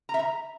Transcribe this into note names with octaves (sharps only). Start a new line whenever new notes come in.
A#5
E5
A#5